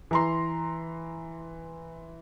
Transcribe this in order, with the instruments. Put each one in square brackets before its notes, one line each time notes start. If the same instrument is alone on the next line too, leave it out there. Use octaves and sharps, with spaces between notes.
[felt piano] E3 A#5 C6